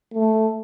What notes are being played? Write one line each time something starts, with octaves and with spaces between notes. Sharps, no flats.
A3